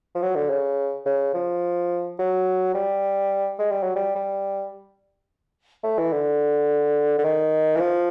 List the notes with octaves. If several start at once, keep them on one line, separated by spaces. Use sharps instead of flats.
F3
F#3
D3
C#3
C#3
F3
F#3
G3
G#3
G3
F#3
G3
G3
A3
E3
D3
D3
D#3
E3
F3